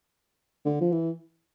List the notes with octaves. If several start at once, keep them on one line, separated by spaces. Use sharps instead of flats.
D3
F3
E3